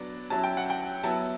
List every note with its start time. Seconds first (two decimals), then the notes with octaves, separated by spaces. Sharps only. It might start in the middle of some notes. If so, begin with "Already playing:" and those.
Already playing: F#3 B3 D4 D5
0.30 F#3 C#4 E4 A5
0.44 G5
0.57 F#5
0.70 G5
1.04 F#3 B3 E4 A5